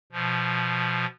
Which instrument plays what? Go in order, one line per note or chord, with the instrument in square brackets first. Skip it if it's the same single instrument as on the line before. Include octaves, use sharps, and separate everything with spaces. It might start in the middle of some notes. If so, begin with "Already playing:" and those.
[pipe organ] B2 F3